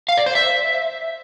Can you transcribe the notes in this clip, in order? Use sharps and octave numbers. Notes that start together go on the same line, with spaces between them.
F5
D5
C5
E5